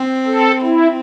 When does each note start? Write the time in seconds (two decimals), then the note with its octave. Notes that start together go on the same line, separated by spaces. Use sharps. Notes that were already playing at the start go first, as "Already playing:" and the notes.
Already playing: C4
0.27 A4
0.62 C4 E4